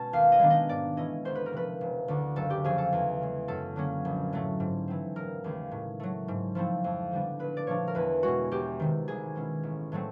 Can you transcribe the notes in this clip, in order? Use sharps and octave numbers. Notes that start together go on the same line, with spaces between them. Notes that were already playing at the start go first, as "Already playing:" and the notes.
Already playing: B2 G#3 C#4 A5
D#2 F5
D#5
D#3 G#3 B3 D4
D#5
G#2 D5
E3 A3 C#4 E4 D#5
D2 C5
B4
A#4
C3 F3 A3 B4
E1
D2 D3
F#1 A4
G4
F2 C#3 F3 G#4
A4
E2
C#3 E3 G#3
F#2 A4
D3 F#3 A#3 C#4
A#1
A2 F#3 A3
G#2
E3 A3 C4
E1 A#4
D#2 C#3 E3 G#3
A2
F#3 A3
G#2
F3 A3 C4 E4
F2
D3 G3 B3 D4
A#1 B4
D5
A#2 F3 A3 D4 C#5
A#4
E2 B4
B2 G#3 F#4
E2 G4
C3 D#3
C2 G#4
B2 G#3 C#4 E4
A1
A2 F#3 A3 C4